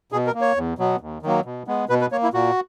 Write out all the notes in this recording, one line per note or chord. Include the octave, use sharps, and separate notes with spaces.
B2 G#4
A#4
A#3
C#5
E2
B2 F#3 B3
D#2
D#3 F#3 A#3
B2
G#3 B3
B2 B4
B4
A#3 C#5
E4
A#2 F#4